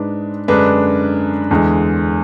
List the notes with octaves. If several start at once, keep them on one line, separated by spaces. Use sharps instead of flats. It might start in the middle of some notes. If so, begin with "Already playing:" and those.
Already playing: G#2 G#3 D4 B4
F#2 D3 G#3 D4 B4
E2 D3 G#3